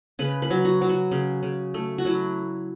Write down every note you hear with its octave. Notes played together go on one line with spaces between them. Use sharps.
C#3 B4
B4
F#3
F#4
F#3
F#4
C#3
C#3
A3
F#4
F#3 E4